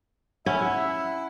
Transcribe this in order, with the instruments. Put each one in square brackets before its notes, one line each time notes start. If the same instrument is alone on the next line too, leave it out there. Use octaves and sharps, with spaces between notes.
[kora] C#4 [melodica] E4 [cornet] E5 [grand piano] F#5